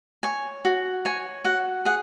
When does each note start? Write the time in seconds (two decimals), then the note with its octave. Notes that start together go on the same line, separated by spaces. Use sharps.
0.23 C#5 G#5
0.65 F#4
1.05 C#5 G#5
1.44 F#4 F#5
1.85 G#4 F#5